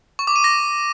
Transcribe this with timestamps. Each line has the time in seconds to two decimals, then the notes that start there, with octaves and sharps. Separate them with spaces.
0.19 C#6
0.27 D6
0.36 D#7
0.44 A#6